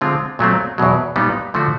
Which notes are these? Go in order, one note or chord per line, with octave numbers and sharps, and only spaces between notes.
D3 F3 G#3 C4 F4
A#2 F#3 A3 C4
E2 B2 F#3
A#2 G3 B3 D#4
D3 F3 A3 D4 F#4